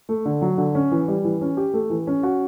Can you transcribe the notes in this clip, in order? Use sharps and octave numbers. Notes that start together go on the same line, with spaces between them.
A3
D3
F#3
D3
C#4
E3
G3
E3
C#4
G4
A3
E3
C#4
F#4